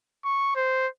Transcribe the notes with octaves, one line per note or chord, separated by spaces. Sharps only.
C#6
C5